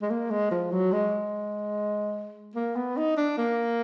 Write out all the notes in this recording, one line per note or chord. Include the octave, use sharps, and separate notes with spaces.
G#3
A#3
G#3
F3
F#3
G#3
A#3
B3
D#4
D4
A#3